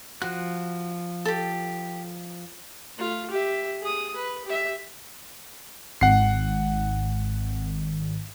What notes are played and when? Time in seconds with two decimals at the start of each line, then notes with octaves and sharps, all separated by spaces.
0.22 F3 F#4 F#6
1.25 G4 A4
2.97 A3 F4
3.31 G4 E5
3.82 G#4 D#6
4.16 B4
4.45 G4 E5
6.01 G#1 F#5 C7